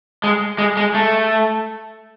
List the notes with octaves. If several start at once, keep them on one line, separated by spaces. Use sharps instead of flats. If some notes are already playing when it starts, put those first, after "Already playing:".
G#3
G#3
G#3
A3